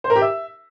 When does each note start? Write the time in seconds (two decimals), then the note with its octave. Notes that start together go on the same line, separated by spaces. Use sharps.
0.04 C5
0.10 A#4
0.16 G4
0.21 E5